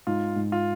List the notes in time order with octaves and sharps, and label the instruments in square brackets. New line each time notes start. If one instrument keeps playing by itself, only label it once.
[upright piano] G#2 [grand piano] F4
[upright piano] G#2
[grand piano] F4